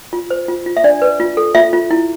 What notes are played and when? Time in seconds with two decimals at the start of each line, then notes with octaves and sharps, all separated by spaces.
0.13 F4
0.30 C5
0.48 F4
0.66 F4
0.77 E5
0.84 D4 D5
1.02 B4
1.20 F4
1.37 A4
1.55 F4 E5
1.73 F4
1.91 E4